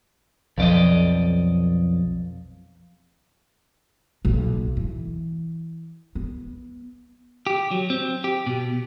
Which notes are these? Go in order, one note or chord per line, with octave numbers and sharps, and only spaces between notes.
B1 F2 F3 D5 D#5
B1 A#2
E3
B3
G4
F#3
C4
G4
B2